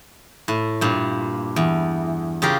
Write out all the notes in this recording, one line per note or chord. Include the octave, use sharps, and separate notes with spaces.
A2
G2 A#2
E2
C#3 F4 G4 A#4